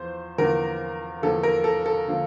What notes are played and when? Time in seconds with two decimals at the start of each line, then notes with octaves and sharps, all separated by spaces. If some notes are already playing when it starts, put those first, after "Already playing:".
Already playing: E2 F3 C5
0.38 E2 D3 F3 A#3 A#4
1.22 E2 D3 F3 A#3 A4
1.43 A#4
1.64 A4
1.86 A4
2.08 D3 F3 A#3